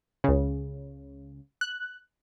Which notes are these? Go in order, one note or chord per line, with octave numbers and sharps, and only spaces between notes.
C#2 C#3
F#6